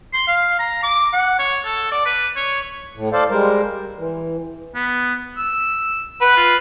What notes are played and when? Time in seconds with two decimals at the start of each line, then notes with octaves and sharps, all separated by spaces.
0.14 C6
0.28 F5
0.59 A#5
0.83 D6
1.13 F#5
1.39 C#5
1.65 A4
1.92 D5
2.06 B4
2.36 C#5
2.95 A2
3.13 A4 C5 D5 F5
3.30 G3 G#3 A#4 C5
3.99 E3
4.75 B3
5.37 E6
6.21 B4 F#5
6.37 F4